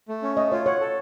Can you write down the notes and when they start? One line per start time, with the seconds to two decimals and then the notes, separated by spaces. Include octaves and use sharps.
0.08 A3
0.22 C#4
0.37 A3 D#5
0.52 F4 C#5
0.66 C#5 F#5
0.80 A4